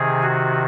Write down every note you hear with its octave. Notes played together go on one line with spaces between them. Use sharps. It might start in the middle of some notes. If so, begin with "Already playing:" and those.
Already playing: C3 D#3 G#4
F#4